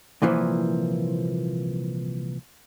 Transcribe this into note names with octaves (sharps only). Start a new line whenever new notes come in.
C2 A#2 E3 F3